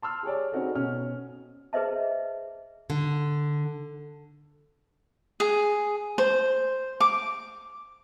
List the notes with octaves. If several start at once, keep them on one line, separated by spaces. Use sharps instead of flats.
A5 C6 E6 F6
G4 G#4 C#5 D5
C4 C#4 D#4 F#4 G#4 A4
B2 C#4 F6
G#4 B4 C5 D#5 E5 A5
D3
G#4
C5
D6